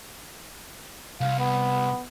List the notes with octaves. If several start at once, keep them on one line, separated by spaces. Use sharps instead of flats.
C2 F5
B3